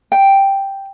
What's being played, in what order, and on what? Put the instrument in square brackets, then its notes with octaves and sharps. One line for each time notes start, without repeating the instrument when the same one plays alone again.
[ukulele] G5